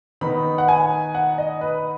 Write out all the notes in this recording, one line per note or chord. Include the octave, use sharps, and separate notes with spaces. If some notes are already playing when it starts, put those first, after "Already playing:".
D#3 B3 D#4 B5
F#5
G#5
F#5
D#5
B4